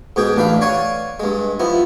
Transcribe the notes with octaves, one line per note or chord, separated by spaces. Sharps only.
G#2 B2 G#4 G5
A1 D4 B4 F5
C#5 D5 F5 F#5 G#5
G2 G#3
F3 B3 E4